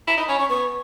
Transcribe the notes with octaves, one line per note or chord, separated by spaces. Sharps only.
E4 A#5
D#4 B5
C#4 B5
C#4 C#6
B3 C#6